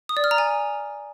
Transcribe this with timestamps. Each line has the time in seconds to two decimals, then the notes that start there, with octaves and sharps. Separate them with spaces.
0.09 D#6
0.17 D5
0.24 F6
0.31 A#5
0.38 G#5